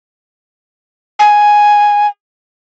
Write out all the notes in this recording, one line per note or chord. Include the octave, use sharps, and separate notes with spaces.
G#5